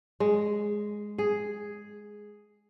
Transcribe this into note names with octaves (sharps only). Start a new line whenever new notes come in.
G#3
G#4